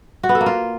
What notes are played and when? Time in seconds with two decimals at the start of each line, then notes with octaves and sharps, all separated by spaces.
0.23 F#4
0.29 B3
0.35 A4
0.41 A#3
0.46 F4